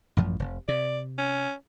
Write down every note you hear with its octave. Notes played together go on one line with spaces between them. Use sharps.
A1 F#2 F3
F1
C3 D5
C#4